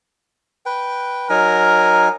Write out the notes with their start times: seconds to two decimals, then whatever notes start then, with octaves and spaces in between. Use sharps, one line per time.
0.66 B4 G5
1.30 F#3 D#4 A#4 G#5